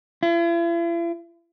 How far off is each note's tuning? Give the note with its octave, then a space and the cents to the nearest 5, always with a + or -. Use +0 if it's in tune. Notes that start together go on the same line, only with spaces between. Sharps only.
E4 +45